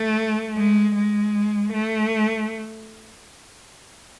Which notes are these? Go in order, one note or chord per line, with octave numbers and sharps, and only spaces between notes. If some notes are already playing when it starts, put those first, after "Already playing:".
Already playing: A3
G#3
G#3
A3